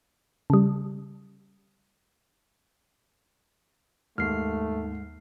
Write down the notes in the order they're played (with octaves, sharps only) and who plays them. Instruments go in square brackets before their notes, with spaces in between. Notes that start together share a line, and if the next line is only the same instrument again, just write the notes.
[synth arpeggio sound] C#3 G3
[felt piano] D#2 [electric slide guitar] G#2 [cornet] A3 [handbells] F6 C7